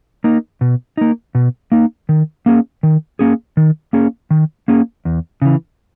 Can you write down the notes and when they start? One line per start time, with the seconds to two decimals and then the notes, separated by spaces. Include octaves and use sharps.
0.24 A#3 D#4
0.61 B2
0.97 A#3 D#4
1.35 B2
1.72 A#3 D#4
2.09 D#3
2.46 A#3 C#4 G#4
2.83 D#3
3.19 A#3 C#4 G#4
3.57 D#3
3.93 A#3 C#4 G#4
4.30 D#3
4.68 A#3 C#4 G#4
5.05 E2
5.42 C#3 E3